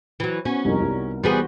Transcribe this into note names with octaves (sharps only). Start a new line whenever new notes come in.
E3 F#3
B3 C#4 F#4
C2 F2 G3 D#4 A#4
C2
E3 G3 B3 F#4 G#4 C5